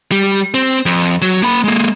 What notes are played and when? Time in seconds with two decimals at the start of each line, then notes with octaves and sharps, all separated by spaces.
0.12 G3
0.54 C4
0.86 F2
1.22 F#3
1.42 A#3 B5
1.64 G#3 A#3